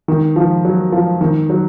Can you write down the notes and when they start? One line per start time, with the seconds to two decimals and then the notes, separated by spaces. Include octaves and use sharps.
0.08 D#3
0.36 F3
0.65 F#3
0.92 F3
1.21 D#3
1.50 F#3